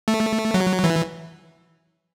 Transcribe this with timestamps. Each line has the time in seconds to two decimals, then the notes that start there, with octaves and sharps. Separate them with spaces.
0.08 A3
0.54 F#3
0.84 E3